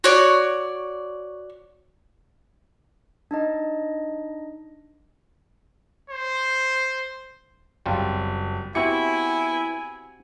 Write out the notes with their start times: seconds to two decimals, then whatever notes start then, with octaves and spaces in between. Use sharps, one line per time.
0.04 F#4 C#5 D5
3.31 D4 D#4 D#5
6.10 C5
7.86 F#1 G3 C4 F4
8.75 B3 C4 E4 F#4 G4 G#5 C#7